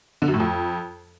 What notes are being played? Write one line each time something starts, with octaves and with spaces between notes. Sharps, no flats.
D3
F#2
A2
F2